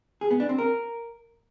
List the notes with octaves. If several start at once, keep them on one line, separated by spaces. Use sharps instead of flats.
G#4
B3
D4
C4
A#4